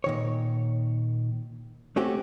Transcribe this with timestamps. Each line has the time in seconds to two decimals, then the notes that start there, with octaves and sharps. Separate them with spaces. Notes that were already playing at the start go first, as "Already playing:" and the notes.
0.04 A#2 D#3 C#5
1.96 A3 C4 C#4 F#4 G4